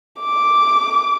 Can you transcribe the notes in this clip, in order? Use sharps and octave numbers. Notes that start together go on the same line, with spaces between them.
D6